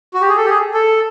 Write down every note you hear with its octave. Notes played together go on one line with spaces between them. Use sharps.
F#4
G4
G#4
A4
G4
G#4
A4